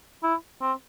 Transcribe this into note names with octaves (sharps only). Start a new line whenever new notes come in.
E4
C4